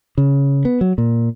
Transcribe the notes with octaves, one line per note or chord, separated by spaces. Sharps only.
C#3
B3
F#3
A#2